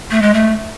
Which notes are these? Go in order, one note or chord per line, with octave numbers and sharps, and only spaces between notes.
A3
G#3
A3